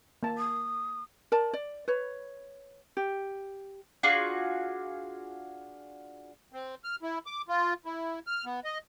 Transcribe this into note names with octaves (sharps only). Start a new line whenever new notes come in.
A#3 A5
D#6
A#4 D5 A5
D5
B4 C#5
G4
D4 F4 F#4 G#4
C4
F6
E4
D6
F4
E4
F6
B3
D#5